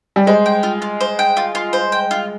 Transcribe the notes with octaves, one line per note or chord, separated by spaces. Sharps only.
G3
G#3 C5
G5
F4
F4
C5
G5
F4
F4
C5
G5
F4